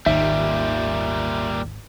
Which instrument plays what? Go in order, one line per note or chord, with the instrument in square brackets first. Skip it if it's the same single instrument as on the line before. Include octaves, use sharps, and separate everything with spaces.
[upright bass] G#1 [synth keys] D#2 [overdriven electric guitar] A#2 G3 [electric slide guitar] E5